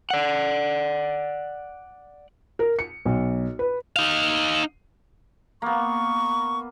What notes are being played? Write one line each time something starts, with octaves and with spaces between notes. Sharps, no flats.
D5 F#5
A#4
C#7
B1
B4
D#4 F5
A#3 B3 C#6